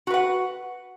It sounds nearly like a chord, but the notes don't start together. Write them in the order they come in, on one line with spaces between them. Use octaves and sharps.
F#4 B4 F#5